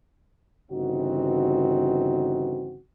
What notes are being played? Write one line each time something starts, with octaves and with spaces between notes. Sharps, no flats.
G1 C#3 E3 C4 D#4 F#4